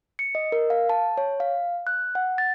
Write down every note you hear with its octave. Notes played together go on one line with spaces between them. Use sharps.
C#7
D#5
A#4
F5
A5
C#5
F5
F#6
F#5
A6